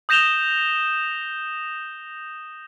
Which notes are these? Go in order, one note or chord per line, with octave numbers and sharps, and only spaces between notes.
D#6 G6 A#6 E7 F7 G7